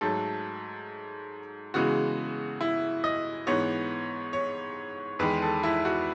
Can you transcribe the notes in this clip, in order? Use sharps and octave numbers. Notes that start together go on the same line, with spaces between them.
G#2 F#3 A3 A4
C#3 E3 G#3 B3 F#4
E4
D#5
G#2 E3 B3 C#5
C#5
E2 D#3 G#3 B4
A4
E4
F#4